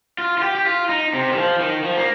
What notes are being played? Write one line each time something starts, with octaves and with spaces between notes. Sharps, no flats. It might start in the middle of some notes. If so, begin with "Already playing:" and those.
F4
F4
G4
G4
F4
D#4
C3
D#3
F3
D#3
F3
A#3